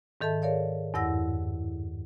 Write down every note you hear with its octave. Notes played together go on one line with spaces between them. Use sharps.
G#2 D#3 A4 E5 A5
G#4 A#4 C#5 D5 F5
E2 G2 E4 F#5 E6 A#6